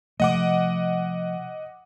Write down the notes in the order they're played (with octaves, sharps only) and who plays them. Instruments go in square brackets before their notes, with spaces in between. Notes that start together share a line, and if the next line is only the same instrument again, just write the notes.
[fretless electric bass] C3 F3 A3 [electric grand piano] D#5 F#5 D6